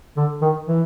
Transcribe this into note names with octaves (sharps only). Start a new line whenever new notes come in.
D3
D#3
E3